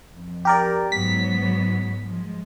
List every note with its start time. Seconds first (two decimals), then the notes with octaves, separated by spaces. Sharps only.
0.15 F2
0.45 G4 A#4 D5
0.92 G#2 F#3 B3 B6
2.06 F3 G#3